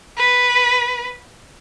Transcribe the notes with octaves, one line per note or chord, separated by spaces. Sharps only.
B4